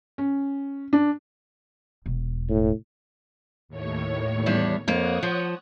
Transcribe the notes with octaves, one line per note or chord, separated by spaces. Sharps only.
C#4
D4
E1
A2
D#2 A2 C#5
E2 G3 D4
F2 A#3 C#5 F#5 D#6
F3